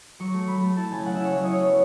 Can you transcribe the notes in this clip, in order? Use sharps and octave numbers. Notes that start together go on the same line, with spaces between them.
F#3 C#6
A3
F#3 B5
A3
E4 A5
C#3 G#5
C#3 F#5
E5
E4 C#5
F#3 C#5
D#5
E4 C#5
B3 C#5